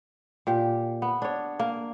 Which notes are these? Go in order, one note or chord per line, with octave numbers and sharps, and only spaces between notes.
A#2 G4
B3
D4 C#5
A#3